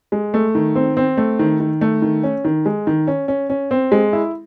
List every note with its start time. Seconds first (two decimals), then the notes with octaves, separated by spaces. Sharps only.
0.12 G#3
0.34 A3
0.55 D#3
0.75 C4
0.97 C4
1.17 A3
1.39 D#3
1.60 D#3
1.81 A3
2.02 D#3
2.23 C#4
2.45 D#3
2.66 G#3
2.87 D#3
3.07 C#4
3.28 C#4
3.50 C#4
3.71 C4
3.92 G#3
4.13 E4